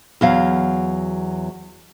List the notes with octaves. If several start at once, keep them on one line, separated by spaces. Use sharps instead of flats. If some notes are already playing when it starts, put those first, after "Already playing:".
E2 F#3 F5